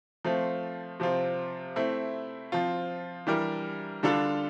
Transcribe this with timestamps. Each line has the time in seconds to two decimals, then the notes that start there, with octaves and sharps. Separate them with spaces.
0.25 F3 A3 C4 F4
1.00 C3 F3 C4 F4
1.76 A3 C4 E4
2.52 F3 C4 F4
3.27 E3 G3 D4 G4 A#4
4.03 D3 G3 D4 F4 A4